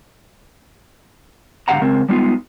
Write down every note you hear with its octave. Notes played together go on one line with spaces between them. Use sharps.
G#2 D3 G4 F5 F#5 A#5
C#3 G#3 C4 A#4
G3 G#3 B3 D#4 F4